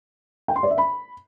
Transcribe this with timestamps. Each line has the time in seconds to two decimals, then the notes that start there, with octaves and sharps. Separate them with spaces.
0.48 G5
0.56 C6
0.63 D5
0.70 E5
0.78 B5